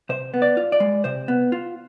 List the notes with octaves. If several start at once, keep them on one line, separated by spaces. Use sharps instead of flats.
C3 C5
B3
D5
F4
D5
G#3
C3 C5
B3
F4